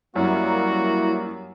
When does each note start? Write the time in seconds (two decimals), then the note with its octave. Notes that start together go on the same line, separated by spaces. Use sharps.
0.16 F#2 G3 A#3 E4 F#4